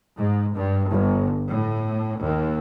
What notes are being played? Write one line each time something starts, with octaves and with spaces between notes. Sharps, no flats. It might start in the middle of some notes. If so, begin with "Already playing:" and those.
G#2
G2
G1
A2
D#2